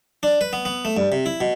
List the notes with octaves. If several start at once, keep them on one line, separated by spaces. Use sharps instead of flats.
D4
B4
B3
B3
A3
G2
C3
E4
B2